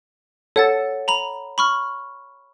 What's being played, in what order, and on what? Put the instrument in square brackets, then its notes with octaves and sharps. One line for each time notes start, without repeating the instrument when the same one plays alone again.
[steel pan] A4 [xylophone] C#5 F#5 A6
[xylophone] A#5 B5 F7
B5 C#6 F6